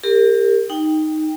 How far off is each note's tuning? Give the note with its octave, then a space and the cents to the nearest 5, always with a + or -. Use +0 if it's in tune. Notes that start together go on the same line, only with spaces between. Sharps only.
G4 +25 A#4 -20
D#4 +0 G5 +10